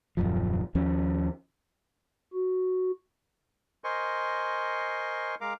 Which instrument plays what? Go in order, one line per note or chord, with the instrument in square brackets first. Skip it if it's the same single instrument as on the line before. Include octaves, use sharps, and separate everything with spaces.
[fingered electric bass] D#1 F#2 F3
D#2 F3 C#4
[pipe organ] F#4
[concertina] A#4 C5 D#5 G#5 C6 C#6
G#3 A#4 F5 A#5 D6